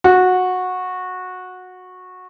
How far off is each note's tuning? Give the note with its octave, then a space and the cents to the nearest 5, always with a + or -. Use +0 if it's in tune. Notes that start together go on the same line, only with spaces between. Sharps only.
F#4 -15